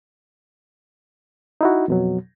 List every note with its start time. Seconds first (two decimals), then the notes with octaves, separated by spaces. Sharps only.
1.61 D#4 E4 F#4
1.88 F2 B2 F#3